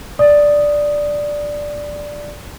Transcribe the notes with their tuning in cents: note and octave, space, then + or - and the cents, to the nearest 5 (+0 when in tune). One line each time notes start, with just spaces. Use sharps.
D5 +0 D#6 +0